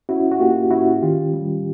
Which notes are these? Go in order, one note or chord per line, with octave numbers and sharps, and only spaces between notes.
C#4 E4 F#4
F#4
A#3 F4 G4
C#4 E4 F#4
D#3 F4 G4
G3